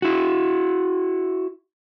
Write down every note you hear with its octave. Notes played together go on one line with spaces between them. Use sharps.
E4 F#4